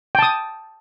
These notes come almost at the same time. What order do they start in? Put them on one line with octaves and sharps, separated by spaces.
G5 A5 D#6